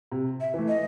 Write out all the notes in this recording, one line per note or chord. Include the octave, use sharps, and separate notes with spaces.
C3
E5
E3 A3
D#5